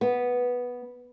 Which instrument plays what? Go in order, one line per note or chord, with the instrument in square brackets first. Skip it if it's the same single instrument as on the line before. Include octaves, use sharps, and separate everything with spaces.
[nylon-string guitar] B3